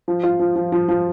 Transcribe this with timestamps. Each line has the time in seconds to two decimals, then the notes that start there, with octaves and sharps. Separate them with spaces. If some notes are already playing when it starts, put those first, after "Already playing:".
0.08 F3
0.23 F4
0.40 F3
0.56 F3
0.72 F3
0.89 F3